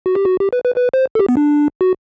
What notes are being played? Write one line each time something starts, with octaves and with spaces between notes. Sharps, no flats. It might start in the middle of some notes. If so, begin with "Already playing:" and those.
F#4
G4
F#4
G4
B4
B4
B4
C5
A4
G4
B3
D4
F#4